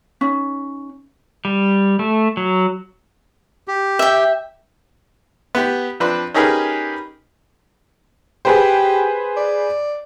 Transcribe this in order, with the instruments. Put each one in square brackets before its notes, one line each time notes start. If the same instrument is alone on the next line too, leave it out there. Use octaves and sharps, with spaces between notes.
[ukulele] C#4 D#4
[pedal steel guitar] G3
A3
F#3
[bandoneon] G4
[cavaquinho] E5 G5
[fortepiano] B3 G4
F3 C4 D4 B4
C#4 D#4 G4 G#4 A#4 B4
[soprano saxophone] G4 [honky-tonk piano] G#4 B4 C5
[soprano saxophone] D5